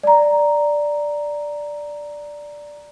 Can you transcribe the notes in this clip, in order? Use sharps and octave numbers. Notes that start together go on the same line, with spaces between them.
D5 A#5